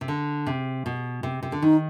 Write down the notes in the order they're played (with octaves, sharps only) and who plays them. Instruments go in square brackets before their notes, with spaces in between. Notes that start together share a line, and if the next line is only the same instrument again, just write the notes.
[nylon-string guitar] C3
D3
C3
B2
C3
C3
D3
[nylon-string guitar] D#3 [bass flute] D#4